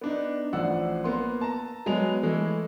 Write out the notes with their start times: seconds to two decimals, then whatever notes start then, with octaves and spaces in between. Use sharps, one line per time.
0.01 B3 D4 D#4
0.53 A1 F3 D5 F#5 E6
1.04 A#3 B3 C6
1.41 A5 A#5
1.86 F#3 G#3 B3 G#4 F7
2.23 E3 G#3 A3 E4 A4